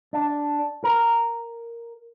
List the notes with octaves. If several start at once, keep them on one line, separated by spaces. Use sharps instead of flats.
D4
A#4